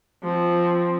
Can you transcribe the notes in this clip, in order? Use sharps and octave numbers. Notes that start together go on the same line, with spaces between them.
F3 C4